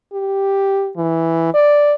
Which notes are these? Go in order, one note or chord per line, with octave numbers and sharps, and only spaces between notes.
G4
E3
D5